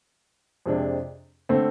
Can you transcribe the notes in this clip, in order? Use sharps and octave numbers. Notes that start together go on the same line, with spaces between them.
F2 C3 G#3 D4
D3 A3 C4